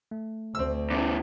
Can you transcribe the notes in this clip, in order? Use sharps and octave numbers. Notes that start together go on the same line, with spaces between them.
A3
D2 C4 E6
E2 A2 C#4 D6